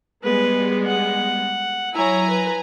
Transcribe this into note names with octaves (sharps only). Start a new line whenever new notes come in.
G3 G#3 B3 B4
F#5
F#3 E4 C#5 G#5 A#5
B4